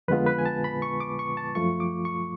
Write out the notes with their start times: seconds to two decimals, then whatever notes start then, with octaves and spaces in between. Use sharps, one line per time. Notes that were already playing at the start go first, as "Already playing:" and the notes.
0.08 F2 D3 G#3 B3 F4 B4
0.26 B4
0.38 G#5
0.46 A5
0.64 B5
0.82 C#6
1.00 D6
1.19 C#6
1.37 A5
1.55 F#2 F3 A3 F4 C#6
1.80 D6
2.05 C#6